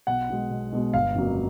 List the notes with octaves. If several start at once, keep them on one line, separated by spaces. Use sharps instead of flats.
B1 F#5
B2 G#3
B1
B2 G#3
G1 F5
F2 C#3 F#3 A#3